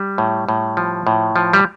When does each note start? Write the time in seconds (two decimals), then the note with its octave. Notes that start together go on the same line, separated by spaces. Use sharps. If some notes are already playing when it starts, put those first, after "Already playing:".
Already playing: G3
0.18 A2
0.49 A2
0.77 F3
1.07 A2
1.36 F3
1.53 G3